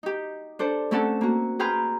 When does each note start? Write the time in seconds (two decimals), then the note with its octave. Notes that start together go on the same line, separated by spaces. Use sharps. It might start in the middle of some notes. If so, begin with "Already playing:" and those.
0.03 D#4 G4
0.59 D4 A4 C5
0.91 A3 C4 C#4 A4 F#5 A5
1.21 A#3 F#4
1.59 G#4 B4 G5 A#5 C6 F6